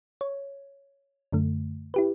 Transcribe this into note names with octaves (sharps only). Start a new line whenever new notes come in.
C#5
F#2 D3 A3
E4 G4 B4